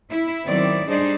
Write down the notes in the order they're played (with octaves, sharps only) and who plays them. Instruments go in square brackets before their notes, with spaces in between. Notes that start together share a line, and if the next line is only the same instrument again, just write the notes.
[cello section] E4
D#3 F#3 B3 C4 E4 D5
G3 D4 D#4 G#4 C5 D5